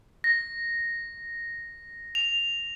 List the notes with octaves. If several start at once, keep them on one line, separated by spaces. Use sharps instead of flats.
A#6
F7